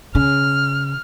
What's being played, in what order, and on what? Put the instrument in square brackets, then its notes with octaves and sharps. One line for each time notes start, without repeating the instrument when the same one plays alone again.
[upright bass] C#3 [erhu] F6